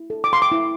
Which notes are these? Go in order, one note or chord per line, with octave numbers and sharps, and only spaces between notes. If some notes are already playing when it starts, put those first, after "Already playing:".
Already playing: E4
A4
D6
C6
D6
E4